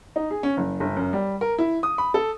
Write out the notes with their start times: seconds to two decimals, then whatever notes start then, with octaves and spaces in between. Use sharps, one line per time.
0.16 D#4
0.31 G#4
0.43 C#4
0.57 F#1
0.80 G1
0.97 F#2
1.13 G3
1.41 A#4
1.58 E4
1.83 D#6
1.98 B5
2.14 A4